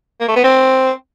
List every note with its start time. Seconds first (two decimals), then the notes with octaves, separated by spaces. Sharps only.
0.21 A#3
0.28 A3
0.36 B3
0.44 C4